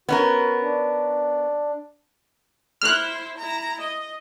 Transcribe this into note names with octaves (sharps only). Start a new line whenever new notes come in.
B3 C#4 F#4 A#4
D4
E4 C5 F6 F#6
E4 A#5
D#5